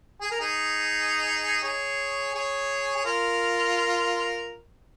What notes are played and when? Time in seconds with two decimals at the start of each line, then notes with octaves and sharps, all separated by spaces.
0.21 G#4
0.31 A#4
0.40 D#4 G#4
1.62 G#4 C#5
2.35 G#4 C#5
2.96 G#4
3.05 F4 A#4